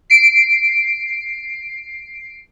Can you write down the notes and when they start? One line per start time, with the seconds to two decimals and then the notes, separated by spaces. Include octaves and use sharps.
0.10 C7 D7